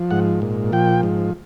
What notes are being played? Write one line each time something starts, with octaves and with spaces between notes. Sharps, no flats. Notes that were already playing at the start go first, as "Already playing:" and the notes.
Already playing: F3
G#2 F#5
A#2
F3 G5
G#2